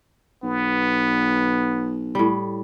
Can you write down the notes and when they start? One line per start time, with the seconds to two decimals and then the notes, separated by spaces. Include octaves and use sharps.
0.43 B1 B3
2.15 A2 G3